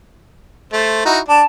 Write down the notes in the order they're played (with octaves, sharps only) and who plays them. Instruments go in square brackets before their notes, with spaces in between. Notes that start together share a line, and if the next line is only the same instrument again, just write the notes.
[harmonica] A3 C5
D#4 E4 F#4
[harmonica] D4 [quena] A5